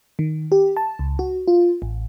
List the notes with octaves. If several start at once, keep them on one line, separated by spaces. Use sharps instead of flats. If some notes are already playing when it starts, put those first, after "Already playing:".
D#3
G4
A5
C#2
F#4
F4
A1